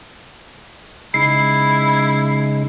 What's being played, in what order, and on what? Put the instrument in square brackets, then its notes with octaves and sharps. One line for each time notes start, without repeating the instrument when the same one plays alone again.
[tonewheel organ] C#3 G#3 D#4 [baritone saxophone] E4 [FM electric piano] C7